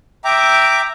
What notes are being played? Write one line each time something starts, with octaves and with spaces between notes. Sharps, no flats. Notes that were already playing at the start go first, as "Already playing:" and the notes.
E5 G5 A#5 D6